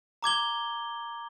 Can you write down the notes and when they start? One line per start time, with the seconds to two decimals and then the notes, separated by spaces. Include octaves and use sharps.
0.23 A#5 D6 G#6 G7